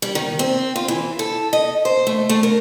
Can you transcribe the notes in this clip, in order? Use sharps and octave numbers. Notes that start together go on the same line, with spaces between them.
G3
D#3
C4
F4
E3
A4
D#5
C5
A3
A3
A#4